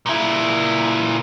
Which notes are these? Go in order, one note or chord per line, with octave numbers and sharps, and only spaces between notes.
A#2 E4